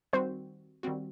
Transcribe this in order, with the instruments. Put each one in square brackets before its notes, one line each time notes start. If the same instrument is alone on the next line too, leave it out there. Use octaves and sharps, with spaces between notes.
[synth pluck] D#3 G3 C4 F#4 [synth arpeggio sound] C5
[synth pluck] D#3 G3 C4 F#4